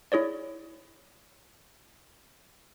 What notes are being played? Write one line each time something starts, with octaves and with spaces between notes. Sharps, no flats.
E4 G#4 C#5 D5